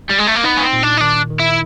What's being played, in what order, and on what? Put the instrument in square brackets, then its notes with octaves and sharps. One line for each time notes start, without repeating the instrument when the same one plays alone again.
[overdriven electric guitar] G3
G#3
A3
A#3
[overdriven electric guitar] B3 [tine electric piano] D#4
[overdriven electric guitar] C#4
C4
[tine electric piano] A#2
[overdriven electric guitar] D4
D#4
[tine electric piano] D#3 [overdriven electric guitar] D4
[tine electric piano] D#3
[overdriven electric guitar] E4